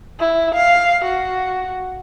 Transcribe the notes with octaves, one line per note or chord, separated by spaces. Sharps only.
E4
F5
F#4